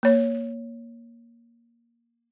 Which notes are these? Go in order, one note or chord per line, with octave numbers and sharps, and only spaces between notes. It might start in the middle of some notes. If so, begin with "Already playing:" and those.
A#3 C#5